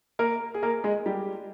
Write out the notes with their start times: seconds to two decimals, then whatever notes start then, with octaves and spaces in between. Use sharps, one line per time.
0.19 A#3 A#4
0.54 G#4
0.63 A#3 A#4
0.84 G#3 G#4
1.06 G3 G4